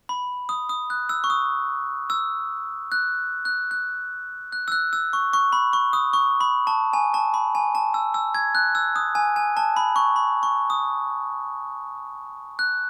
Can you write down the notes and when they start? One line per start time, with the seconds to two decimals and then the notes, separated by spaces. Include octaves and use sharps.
0.09 B5
0.49 D#6
0.69 D#6
0.90 F#6
1.09 E6
1.24 C#6
1.30 D#6
2.10 E6
2.92 F#6
3.45 F#6
3.71 F#6
4.52 F#6
4.68 E6
4.72 F#6
4.93 E6
5.13 C#6
5.33 C#6
5.53 B5
5.73 C#6
5.93 D#6
6.13 C#6
6.41 B5
6.67 A5
6.93 G#5
7.14 A5
7.34 B5
7.55 G#5
7.75 A5
7.94 E6
8.14 E6
8.35 G#6
8.55 F#6
8.75 E6
8.96 D#6
9.15 G#5
9.36 G#5
9.57 A5
9.76 B5
9.96 C#6
10.16 B5
10.43 C#6
10.70 D#6
12.59 F#6